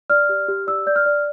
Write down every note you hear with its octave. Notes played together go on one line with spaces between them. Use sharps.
D5 F6
G4
G4
D5 E6
D5 G6
F6
D5